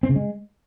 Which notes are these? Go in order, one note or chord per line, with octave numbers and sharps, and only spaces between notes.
C4
C#3
G#3